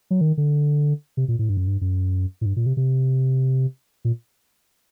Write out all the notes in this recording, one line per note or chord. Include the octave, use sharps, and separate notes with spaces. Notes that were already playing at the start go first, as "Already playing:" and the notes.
F#3
D#3
D3
C3
A#2
A2
G2
F#2
G2
F#2
A2
G2
A#2
C3
C3
A#2